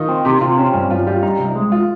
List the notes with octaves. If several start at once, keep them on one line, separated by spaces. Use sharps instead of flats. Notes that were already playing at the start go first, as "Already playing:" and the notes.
Already playing: D#3 D#4 F4
C4
C3 G4
C3 F4
C4 C#4
G2 C#4
G2 F4
G3 F4
D#4
C2
G#3
F4